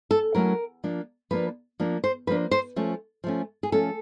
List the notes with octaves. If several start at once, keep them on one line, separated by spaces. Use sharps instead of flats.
A4
F#3 A3 C#4 E4 A#4
F3 A#3 D4
F3 A#3 D4 B4
F3 A#3 D4
C5
F3 A#3 D4 B4
C5
F3 A3 C#4
F3 A3 C#4
G#4
F3 A3 C#4 A4